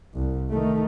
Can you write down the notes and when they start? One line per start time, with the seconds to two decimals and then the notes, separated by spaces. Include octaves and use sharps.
0.14 C2
0.50 D#3 A3